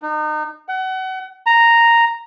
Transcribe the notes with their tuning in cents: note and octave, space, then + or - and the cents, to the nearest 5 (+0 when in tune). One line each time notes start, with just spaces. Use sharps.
D#4 -35
F#5 +30
A#5 -5